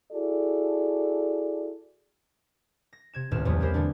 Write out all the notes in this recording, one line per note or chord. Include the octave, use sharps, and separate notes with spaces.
E4 F#4 G#4 A4 D5
A#6
C3 G#6 E7
D#1 C#2 A2 D#3 F6 E7
E2 F3 G3 A3 B3
C4 E4 G4 A#4 C5
D3 F3 A3 D4